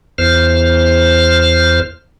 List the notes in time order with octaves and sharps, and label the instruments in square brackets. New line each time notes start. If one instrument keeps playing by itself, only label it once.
[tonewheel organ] E2 C5 F6